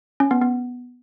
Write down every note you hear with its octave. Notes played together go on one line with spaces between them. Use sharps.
C#4
B3
B3